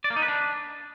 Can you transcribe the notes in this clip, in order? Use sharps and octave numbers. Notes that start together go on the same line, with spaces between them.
D5
A#3
D#4
B4
D4